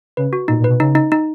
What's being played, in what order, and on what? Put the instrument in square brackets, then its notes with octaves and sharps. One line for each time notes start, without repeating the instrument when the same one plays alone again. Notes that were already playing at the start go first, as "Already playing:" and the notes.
[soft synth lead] C#3 [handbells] B4
[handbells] F#4
[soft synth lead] A#2 [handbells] D#4
[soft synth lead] A#2
[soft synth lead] B2 [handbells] B4
[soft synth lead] C#3 [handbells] D#4
[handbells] D#4
D#4